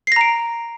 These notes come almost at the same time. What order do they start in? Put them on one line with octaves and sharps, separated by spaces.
C7 A#6 A#5 D7